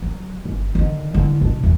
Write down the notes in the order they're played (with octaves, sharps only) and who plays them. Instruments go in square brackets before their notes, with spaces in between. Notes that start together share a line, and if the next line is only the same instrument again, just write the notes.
[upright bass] F#3
G1
D3 D#3
D3 E4
B2 D4
E2